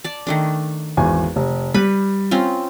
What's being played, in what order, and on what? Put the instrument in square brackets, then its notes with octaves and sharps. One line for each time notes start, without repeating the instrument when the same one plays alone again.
[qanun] D5 A5
D#3 A3 D4
[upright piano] G#1 E2 G#5
F1
[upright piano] G3 [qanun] B4 B5
[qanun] C4 C#4 F4